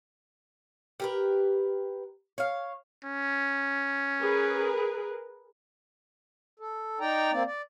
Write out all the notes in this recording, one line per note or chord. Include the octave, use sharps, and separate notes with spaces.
G4 A#4 B4
C#5 F5
C#4
G#4 A#4 B4
A4
D#4 D5 G5 A#5
A#3 C4 D5
D5